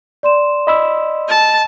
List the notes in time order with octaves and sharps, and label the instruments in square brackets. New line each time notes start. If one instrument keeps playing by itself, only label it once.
[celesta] D5 C6 E7
[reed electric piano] D#5 B5 E6
[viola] A5